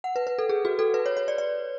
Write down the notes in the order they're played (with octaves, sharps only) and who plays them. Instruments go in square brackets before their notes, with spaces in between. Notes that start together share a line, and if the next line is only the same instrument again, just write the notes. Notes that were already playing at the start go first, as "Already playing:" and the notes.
[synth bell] F#5
B4
B4
A4
G#4
F#4
A4
B4
C#5
C#5
D5
D5